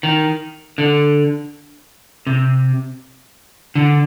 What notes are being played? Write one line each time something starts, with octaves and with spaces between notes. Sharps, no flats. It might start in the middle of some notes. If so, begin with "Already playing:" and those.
D#3
D3
C3
D3